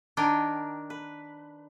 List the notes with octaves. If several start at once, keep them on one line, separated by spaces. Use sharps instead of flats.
D#3 D4 A#4 G5 G#5
B4